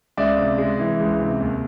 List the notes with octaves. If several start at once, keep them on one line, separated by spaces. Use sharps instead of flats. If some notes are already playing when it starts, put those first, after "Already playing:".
C#2 D5 E5
C3
G#3
E3
C#2
C3
D#2